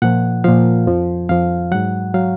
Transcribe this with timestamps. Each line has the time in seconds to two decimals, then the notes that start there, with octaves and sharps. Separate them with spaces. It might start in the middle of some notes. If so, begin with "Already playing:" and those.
0.02 A#2 F3 F#5
0.44 A#2 F3 F5
0.87 F2 F3
1.29 F2 F3 F5
1.71 G#2 F#3 F#5
2.14 F#3 F5